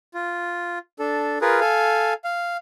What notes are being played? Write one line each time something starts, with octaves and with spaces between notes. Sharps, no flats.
F4
D4 A4
F4 G#4 A#4 B4
A4 F5 G#5
F5